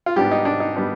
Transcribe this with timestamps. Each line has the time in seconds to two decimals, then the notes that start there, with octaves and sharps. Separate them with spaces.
0.06 F4
0.16 G#2 G3 B3 D4 G4
0.31 D#4
0.45 D4
0.60 D#4
0.76 G3 B3 D4